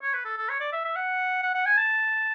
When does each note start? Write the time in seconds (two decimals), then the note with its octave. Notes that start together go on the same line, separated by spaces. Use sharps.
0.02 C#5
0.14 B4
0.25 A4
0.37 A4
0.49 C#5
0.61 D5
0.72 E5
0.85 E5
0.96 F#5
1.43 F#5
1.55 F#5
1.66 G#5
1.78 A5